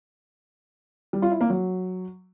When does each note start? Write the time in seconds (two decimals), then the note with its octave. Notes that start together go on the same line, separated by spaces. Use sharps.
1.13 G3
1.22 F4
1.31 E4
1.41 A#3
1.50 F#3